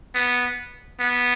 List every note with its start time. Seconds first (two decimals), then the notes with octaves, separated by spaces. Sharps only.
0.15 B3
1.00 B3